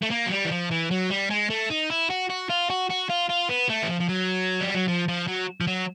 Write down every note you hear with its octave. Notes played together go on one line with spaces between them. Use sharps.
A3
A#3
F#3
G3
E3
F3
E3
F#3
G3
G#3
A3
D#4
E4
F#4
F#4
F4
F#4
F#4
F4
F4
B3
A3
E3
F3
F3
F#3
G3
F#3
F3
F3
F#3
F3
F#3